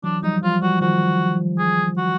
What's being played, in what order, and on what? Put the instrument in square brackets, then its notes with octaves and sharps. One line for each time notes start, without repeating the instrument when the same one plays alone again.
[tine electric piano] E3 F#3 [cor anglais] D4
[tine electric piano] F3 G3 [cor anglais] D#4
[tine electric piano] F3 G3 [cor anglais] F4
[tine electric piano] F3 G3 [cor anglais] F#4
[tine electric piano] D#3 F3 [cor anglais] F#4
[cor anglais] G#4
F#4